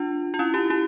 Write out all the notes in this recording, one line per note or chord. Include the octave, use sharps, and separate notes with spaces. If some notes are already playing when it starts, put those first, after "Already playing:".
Already playing: D4 F4
F4
C#4 E4
E4 G4
E4 G4